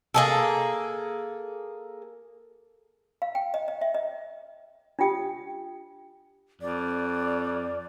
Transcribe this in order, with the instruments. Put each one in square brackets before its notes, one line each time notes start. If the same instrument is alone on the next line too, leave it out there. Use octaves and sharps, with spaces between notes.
[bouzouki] A#3 G#4 A4
[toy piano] F5
G5
D#5
D#5
E5
D#5
D4 F4 G4 G5 D#6
[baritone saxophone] F2 [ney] D5